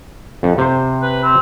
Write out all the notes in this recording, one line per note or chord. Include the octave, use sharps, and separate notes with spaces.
F2
C3 C5
B4
C4